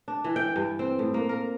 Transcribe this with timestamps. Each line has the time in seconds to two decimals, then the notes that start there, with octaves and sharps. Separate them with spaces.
0.08 D4
0.24 E3
0.36 G5
0.56 G2
0.79 C4
0.99 A2
1.14 A#3
1.29 A#4